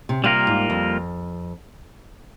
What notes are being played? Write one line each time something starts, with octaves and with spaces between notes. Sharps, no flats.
C3
C3 G3 A#3 F4 A#4
G#2
F2